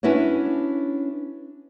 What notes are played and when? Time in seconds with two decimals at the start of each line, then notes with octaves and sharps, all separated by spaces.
0.03 C#4 D4 E4 F#4 B4 C#5